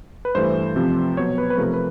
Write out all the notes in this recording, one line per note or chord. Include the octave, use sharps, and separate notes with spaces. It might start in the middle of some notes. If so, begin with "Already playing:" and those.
B4
G2 E3 A3 C5
C3 F3 A3 C4
B2 F#3 B3 C#5
B4
B4
C3 F3 A3 A#4
B4